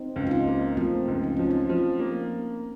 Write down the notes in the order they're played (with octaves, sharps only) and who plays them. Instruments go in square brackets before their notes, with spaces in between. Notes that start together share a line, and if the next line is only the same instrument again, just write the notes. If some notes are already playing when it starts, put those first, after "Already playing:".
Already playing: [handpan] C4 D#4
[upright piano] C#2
[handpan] F4
C4 D#4
[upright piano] A#3
[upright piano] F3 [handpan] A3 C4
[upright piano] C#2
[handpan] D#4
[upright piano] F3 [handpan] C#4
[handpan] C4 D#4
[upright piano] F3
A#3